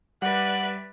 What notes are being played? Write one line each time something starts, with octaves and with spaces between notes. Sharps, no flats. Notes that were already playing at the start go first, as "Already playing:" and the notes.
G3 B4 D5 E5 F#5